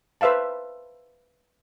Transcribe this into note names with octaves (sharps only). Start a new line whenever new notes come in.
B4 C5 E5 F5 A5